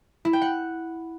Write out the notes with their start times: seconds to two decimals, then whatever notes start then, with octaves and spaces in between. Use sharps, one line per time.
0.25 E4
0.33 G5
0.42 F#5